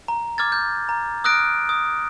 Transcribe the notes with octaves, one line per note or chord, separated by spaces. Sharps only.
A#5
D6 F6 G#6 A6
G6
A#5
D#6 F6 F#6 A#6 D7
D#6